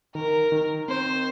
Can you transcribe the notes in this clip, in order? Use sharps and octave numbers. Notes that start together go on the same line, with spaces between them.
D#3 A#4
D#3
C4 C5